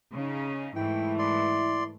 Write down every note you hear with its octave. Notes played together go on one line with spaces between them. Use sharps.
C#3 C#4 D#4
G#2 E3 A3 E4 G5
D5 C6